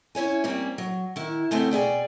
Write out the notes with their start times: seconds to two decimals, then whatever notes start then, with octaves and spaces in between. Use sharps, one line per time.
0.15 C#4 E4 C#5 G#5
0.44 G3 A#3 C4 C#4
0.78 F#3
1.16 D#3 E4
1.51 C#3 A3 B3 C4
1.71 B2 G#4 D5 G5